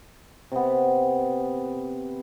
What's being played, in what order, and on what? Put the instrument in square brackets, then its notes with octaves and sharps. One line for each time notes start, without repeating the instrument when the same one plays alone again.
[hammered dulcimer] C3 B3